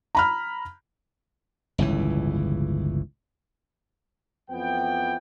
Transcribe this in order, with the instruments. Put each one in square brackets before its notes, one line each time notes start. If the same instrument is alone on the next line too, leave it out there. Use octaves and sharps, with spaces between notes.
[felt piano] A#5 B5 F6
[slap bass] G1 C#2 A2 E3
[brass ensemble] F2 E3 F3 B3 G5